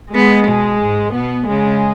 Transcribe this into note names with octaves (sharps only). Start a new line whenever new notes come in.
G#3 B3
B2
G#2
B2 B3
C#3 G#3